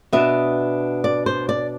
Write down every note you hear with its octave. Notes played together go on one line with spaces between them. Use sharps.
B2 B3 D4 E5
D5
C5
D5